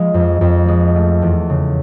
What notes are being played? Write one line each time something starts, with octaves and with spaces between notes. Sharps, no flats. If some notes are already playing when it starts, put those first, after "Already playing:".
Already playing: F3 G#3
F2
F2
G#3
A3
E2
C#3